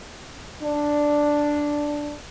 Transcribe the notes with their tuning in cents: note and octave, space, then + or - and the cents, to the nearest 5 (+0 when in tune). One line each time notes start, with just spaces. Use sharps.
D4 +0